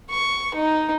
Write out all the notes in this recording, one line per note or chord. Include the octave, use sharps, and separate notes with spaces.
C#6
D#4